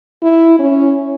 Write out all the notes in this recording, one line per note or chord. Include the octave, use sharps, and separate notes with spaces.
E4
C#4